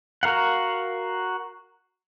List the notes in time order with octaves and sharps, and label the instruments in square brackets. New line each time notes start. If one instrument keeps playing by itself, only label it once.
[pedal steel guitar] F#4 A#4 F5 F#5